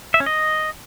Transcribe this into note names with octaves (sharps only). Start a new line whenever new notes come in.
E5
C#4
D#5